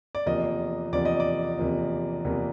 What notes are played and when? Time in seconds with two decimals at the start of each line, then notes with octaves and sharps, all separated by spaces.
0.15 D5
0.26 E2 C3 F3 A#3 D#5
0.93 E2 C3 F3 A#3 D5
1.05 D#5
1.20 D5
1.59 E2 C3 F3 A#3
2.25 E2 C3 F3 A#3